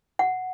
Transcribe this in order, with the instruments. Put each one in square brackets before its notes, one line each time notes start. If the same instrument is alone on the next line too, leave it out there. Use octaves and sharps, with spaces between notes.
[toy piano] F#5